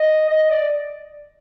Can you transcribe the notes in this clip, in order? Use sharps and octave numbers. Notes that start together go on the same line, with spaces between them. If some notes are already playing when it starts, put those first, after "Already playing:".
Already playing: D#5
D#5
D5